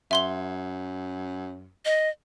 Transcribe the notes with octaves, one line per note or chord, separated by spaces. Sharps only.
F#2 E5 C6 G7
D#5